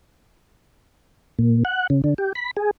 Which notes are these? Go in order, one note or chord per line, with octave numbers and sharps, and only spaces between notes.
A#2
F#5
C#3
D3
G4
B5
G#4